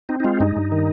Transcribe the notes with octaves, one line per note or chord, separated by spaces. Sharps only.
C4 D#4
D#4
G#3 F4
G2 D#4
G2
D#3